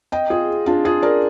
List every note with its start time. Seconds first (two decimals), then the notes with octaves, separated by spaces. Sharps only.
0.12 D#5 G5
0.30 F4 G#4
0.66 D4 F4
0.85 F4 G#4
1.02 A#4 D5